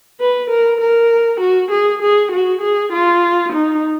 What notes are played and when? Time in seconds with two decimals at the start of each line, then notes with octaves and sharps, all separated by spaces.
0.21 B4
0.50 A#4
0.81 A#4
1.40 F#4
1.71 G#4
2.02 G#4
2.32 F#4
2.62 G#4
2.92 F4
3.52 D#4